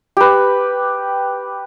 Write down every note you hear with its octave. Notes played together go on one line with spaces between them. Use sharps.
G4 B4